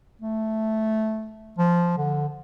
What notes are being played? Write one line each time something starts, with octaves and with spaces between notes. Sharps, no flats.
A3
F3
D3